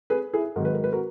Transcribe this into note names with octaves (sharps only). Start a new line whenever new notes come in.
G#4 B4
E4 G#4
G#2 D#3 F#3 A#4
B4
A#4
B4
F#4 A#4